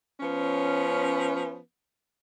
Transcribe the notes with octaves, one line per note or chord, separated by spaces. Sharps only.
F3 B3 C#4